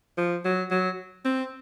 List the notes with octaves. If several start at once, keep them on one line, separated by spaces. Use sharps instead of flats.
F3
F#3
F#3
C4